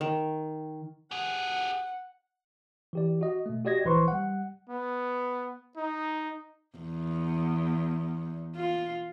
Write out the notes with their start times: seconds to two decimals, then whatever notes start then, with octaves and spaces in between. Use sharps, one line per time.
0.01 D#3
1.11 G4 G#4 F#5
2.93 E3 G4 D5
3.21 F#4 D#5
3.46 B2 A3
3.65 F#4 G4 D5 D#5 G#6 A#6
3.85 A#1 E3 B4 C5 C6 C#6
4.08 G3 F#5
4.70 B3
5.77 D#4
6.78 E2
8.56 F4